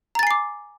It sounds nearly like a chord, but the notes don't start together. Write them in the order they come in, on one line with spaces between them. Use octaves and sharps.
A#5 A6 G#5 C7 D6